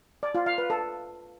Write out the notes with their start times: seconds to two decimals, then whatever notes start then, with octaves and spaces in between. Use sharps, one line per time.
0.23 D5
0.35 F4
0.46 F5
0.58 B4
0.70 A4